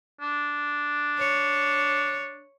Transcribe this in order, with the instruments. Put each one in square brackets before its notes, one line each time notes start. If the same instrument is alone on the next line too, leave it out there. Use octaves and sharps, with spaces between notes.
[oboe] D4
[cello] C#5